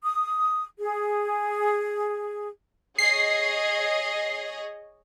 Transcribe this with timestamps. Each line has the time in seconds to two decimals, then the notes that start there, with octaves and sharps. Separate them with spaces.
0.03 D#6
0.79 G#4
2.98 G#4 C#5 D#5 C7